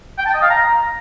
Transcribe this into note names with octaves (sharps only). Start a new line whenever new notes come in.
G5
A5
D#5
F5
A#5